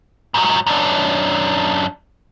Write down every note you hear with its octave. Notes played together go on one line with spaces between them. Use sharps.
G#2 F#3
F#2 D4